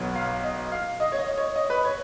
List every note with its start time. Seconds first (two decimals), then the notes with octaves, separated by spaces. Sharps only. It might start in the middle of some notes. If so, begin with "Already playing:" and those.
Already playing: B1 B2 F#3
0.15 F5
0.44 D#5
0.72 F5
1.00 D#5
1.12 C#5
1.19 D#5
1.38 C#5
1.56 D#5
1.70 B4
1.85 C#5